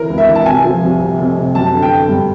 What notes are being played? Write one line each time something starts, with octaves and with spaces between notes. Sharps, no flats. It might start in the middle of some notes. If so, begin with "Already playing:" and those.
Already playing: E3 A#4
C#2
E5
E3
A5
C3 G#5
F3
C2
C3
F1
C3
F#2 A5
D3
G5
D3
G2